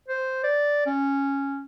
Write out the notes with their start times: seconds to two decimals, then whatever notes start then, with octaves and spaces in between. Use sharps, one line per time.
0.08 C5
0.43 D5
0.86 C#4